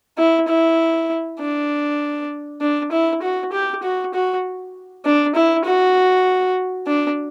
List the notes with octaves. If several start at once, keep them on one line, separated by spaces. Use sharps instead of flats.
E4
E4
D4
D4
E4
F#4
G4
F#4
F#4
D4
E4
F#4
D4